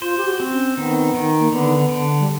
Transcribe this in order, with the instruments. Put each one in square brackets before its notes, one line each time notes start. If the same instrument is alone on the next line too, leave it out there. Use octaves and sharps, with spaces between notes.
[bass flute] F4 [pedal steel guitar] C5
[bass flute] G4
F#4
[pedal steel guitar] C4
[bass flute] C#4
[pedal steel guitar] D#3 [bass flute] B3
[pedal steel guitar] D#3
[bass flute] A#3
[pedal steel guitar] D3 [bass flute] B3
[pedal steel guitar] D3
[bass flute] G3